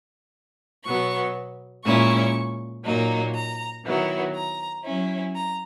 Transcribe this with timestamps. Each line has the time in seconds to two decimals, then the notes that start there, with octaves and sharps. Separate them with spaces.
0.85 B2 F#3 B3 C#6
1.85 A#2 G#3 C#4 E4 C#6
2.85 A#2 F#3 A#3 D#4
3.35 A#5
3.85 D#3 F#3 B3 E4
4.36 A#5
4.84 F#3 C#4 E4
5.35 A#5